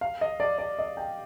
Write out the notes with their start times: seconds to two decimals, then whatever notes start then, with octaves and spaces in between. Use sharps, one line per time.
0.01 F5
0.21 D#5
0.40 D5
0.58 D5
0.79 D#5
0.97 G5